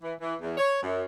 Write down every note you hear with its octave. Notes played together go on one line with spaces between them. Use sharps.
E3
E3
E2
C#5
F#2